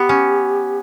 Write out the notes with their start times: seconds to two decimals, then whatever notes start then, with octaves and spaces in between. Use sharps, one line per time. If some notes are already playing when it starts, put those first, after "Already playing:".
Already playing: B3 G4
0.09 C#4